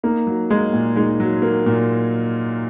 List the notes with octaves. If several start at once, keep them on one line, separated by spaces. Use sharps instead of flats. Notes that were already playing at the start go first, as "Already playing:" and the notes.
A#3 D#4
F#3
G#3 A#3
A#2
G#3 D#4
F#3
A#3
A#2